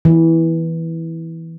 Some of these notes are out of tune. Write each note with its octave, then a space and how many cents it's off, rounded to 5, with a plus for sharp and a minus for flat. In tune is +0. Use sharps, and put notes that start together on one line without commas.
E3 -10